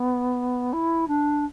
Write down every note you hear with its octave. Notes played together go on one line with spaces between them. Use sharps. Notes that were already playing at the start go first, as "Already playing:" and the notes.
Already playing: B3
E4
D4